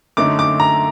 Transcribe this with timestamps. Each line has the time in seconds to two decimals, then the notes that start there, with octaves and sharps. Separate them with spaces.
0.17 F#2 D3 A3 D#4 D6
0.39 D6
0.60 A#5